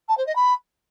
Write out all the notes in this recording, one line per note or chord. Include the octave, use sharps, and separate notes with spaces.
A5
C5
D#5
B5